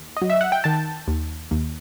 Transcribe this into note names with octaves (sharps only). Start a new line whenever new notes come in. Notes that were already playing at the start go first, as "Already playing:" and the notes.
Already playing: D#2
D#5
F#3
E5
F#5
G5
D#3 A5
D#2
D#2